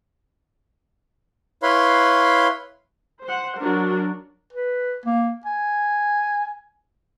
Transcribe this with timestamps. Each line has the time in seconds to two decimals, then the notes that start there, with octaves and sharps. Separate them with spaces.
1.63 E4 B4 C#5 F5 B5 C6
3.24 C5 F#5
3.59 F#3 D4 F#4 A#4
4.53 B4
5.06 A#3
5.45 G#5